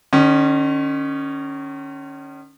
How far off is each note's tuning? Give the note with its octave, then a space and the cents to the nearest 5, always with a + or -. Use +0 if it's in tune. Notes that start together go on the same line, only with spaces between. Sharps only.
D#3 -35 C#4 +0